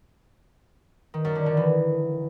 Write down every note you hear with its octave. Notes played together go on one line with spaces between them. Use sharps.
D#3
F#2
D3
D3
E3